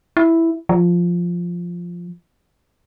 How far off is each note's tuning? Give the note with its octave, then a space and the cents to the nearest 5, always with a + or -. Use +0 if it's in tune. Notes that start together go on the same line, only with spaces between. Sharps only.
E4 +0
F3 +0